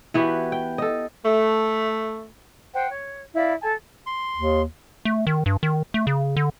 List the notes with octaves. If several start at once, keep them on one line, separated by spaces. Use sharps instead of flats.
E3 B3 F#4 G4
G5
A4 D#5
A3
C5 F#5 G5
C#5
E4 D5 F5 B5
A4 G#5 A5
C6
D#2
A3
D#3
G2
D#3
A3
C#3
D3